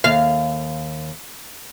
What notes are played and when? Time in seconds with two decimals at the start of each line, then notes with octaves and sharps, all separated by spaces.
0.04 D#2 F5